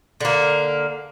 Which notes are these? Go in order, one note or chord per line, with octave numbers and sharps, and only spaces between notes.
D3 A#3